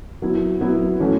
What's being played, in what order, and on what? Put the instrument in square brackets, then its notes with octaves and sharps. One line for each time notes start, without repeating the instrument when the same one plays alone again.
[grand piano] F#3 B3 E4
F#3 B3 E4
A2 E3 A3 C#4 F#4